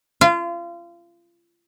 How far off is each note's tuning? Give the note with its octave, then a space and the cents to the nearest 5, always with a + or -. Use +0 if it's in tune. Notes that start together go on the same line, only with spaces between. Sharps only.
F4 -30